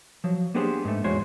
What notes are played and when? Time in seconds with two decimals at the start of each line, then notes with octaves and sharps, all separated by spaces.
0.24 F3 F#3
0.54 A#3 B3 D4 G4 G#4 C5
0.85 G#2 A3
1.04 E2 G#2 G#3 F#4 C5 C#5